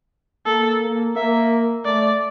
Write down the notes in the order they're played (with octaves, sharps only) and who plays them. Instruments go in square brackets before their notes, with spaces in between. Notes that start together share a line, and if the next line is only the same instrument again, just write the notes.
[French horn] A#3 [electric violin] A4
[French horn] A#3
[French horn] A#3 [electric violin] E5
[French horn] A3 [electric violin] D5